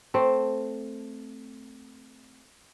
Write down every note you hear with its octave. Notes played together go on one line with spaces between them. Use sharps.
A3 C4